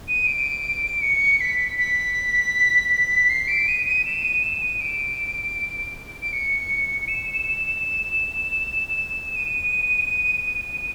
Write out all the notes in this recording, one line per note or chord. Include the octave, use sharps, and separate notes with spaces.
D#7
D7
C#7
B6
B6
C7
D7
D#7
D#7
E7
D#7
E7
D#7
D7
D7
C#7
E7
D#7